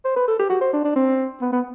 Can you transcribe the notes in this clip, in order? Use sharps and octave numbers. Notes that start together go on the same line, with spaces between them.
C5
B4
A4
G4
F#4
C5
D4
D4
C4
B3
B3